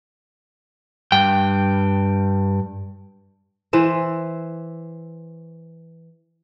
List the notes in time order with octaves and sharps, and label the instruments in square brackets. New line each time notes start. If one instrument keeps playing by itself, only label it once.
[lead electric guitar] G2 G5
[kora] E3 C5 E5